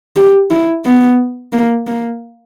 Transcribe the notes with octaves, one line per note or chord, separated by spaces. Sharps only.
G4
E4
B3
A#3
A#3